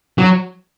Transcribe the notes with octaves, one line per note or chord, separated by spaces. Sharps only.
F#3